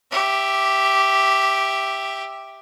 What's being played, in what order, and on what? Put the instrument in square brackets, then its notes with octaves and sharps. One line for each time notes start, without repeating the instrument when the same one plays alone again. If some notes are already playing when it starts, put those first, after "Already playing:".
[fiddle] G4 E5